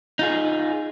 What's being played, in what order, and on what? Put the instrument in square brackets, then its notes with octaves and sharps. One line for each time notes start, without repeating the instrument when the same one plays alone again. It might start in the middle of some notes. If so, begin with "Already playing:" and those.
[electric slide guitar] D#4 F4 G#4